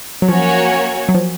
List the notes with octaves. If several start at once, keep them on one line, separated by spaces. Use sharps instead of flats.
F#3
F3 A#3 C#4 F#4 C#5
F#3
F3